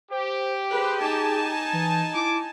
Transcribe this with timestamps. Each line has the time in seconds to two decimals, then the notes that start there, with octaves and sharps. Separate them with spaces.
0.11 G4 C5
0.72 G#4 B4 C5
1.02 D#4 G#5 A5
1.73 E3
2.15 E4 D6